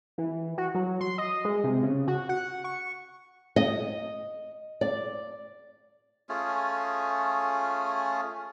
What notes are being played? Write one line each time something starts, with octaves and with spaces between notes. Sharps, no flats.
E3
F#4
F#3
C6
D#5
G#3
C3
C#3
F#4
F#5
C#6
D#5
D5
A3 C#4 F4 G#4